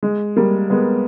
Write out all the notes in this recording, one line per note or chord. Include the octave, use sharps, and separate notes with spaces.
G#3
G3 A#3
G#3 B3